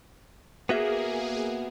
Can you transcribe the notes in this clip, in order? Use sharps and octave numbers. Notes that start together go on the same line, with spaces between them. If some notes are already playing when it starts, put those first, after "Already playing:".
A#3 B3 F#4 G#4 E5